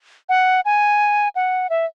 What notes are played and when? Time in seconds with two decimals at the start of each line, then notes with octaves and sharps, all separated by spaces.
0.29 F#5
0.65 G#5
1.36 F#5
1.70 E5